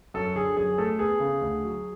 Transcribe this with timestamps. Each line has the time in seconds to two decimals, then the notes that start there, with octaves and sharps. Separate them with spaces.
0.14 F#2 A4
0.36 D3 G#4
0.57 F#2 G#4
0.78 A3 A4
0.99 B3 G#4
1.20 C#3
1.42 D2
1.63 F#3